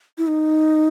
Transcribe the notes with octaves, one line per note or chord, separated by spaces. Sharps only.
E4
D#4